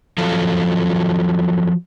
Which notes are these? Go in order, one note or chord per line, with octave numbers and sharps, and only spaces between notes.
F3 F#3 F4 A4